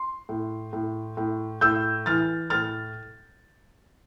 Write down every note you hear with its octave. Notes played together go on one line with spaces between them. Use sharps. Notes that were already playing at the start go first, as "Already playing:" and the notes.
Already playing: C6
A2
A2
A2
A2 E6 G6
E3 F6 A6
A2 F6 A6